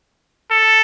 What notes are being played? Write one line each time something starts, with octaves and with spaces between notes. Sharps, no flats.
A4